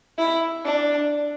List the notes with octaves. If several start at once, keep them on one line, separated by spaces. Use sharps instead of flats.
E4
D4